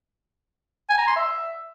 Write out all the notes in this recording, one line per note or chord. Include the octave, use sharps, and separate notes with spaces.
G#5
A#5
C6
E5